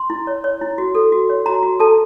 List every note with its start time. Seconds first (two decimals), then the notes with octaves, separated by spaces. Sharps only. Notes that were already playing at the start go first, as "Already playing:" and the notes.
Already playing: C6
0.10 E4
0.27 C#5
0.44 C#5
0.61 E4
0.78 F#4
0.95 A4
1.12 F#4
1.29 C#5
1.46 F#4 A#5
1.63 F#4
1.80 A4 A5